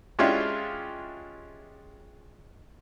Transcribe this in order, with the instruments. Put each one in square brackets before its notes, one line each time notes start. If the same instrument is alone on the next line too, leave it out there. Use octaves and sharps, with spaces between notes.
[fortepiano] G#3 C#4 D4 E4 F4 G4